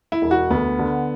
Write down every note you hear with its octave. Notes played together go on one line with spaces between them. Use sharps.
E4
E1
F#4
D2 B3
D3